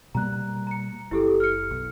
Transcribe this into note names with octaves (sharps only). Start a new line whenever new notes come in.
B2 G3 A#3 A#5 F#6
A#5 C#7
F#1 E4 G4 A4
F6 C#7
B1